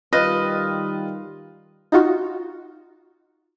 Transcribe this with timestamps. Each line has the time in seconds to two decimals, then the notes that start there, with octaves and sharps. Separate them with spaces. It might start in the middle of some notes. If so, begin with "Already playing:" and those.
0.13 D#3 G3 F4 B4 D#5
1.92 D#4 F4 F#4